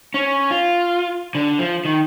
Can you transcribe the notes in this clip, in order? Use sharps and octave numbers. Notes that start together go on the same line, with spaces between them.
C#4
F4
D3
F3
D#3